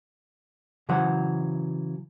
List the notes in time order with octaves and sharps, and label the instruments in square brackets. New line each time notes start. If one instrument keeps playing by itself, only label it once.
[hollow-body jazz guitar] C#3 E3 F#3 C5 F#5